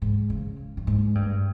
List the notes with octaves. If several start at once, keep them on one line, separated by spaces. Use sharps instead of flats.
G#2
C#3
G2
G#2
G2